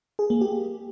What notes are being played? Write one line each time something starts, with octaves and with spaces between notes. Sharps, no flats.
G#4
A#3
G4